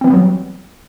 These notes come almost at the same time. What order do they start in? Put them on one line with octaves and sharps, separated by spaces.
C4 E3 B3 G3 F#3